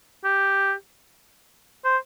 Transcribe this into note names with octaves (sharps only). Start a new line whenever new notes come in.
G4
C5